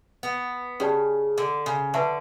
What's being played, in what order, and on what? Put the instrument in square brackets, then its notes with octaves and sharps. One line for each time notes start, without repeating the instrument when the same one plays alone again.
[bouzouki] B3
[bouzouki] C#3 [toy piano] C#4 G4 D5 A5
[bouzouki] D3
C#3
[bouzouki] D3 [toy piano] B4 E5 A5 C#6